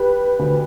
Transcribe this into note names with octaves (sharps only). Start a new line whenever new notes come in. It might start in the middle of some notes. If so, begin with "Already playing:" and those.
Already playing: G4 B4
D2 D3